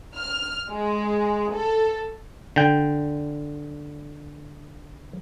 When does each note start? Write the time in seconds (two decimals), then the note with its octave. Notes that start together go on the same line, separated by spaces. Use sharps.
0.16 F6
0.70 G#3
1.53 A4
2.56 D3 G5